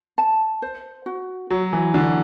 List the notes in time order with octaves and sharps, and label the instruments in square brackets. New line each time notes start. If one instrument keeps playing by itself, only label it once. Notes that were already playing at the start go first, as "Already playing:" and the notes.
[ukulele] A5
C5
F#4
[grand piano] F#3 [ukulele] F#4
[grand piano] E3
[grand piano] D3 [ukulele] F#4